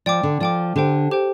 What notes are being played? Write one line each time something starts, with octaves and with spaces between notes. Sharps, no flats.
F3 D5 G5 D6
D3
F3 D5 G5 D6
D3 G4 C5 G5
G4 C5 G5